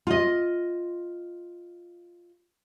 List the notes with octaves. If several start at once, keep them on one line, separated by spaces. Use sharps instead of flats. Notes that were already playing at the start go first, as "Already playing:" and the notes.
F4 D#5